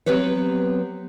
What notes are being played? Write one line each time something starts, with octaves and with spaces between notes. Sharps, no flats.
F#3 B3 C4 G4 B4 C#5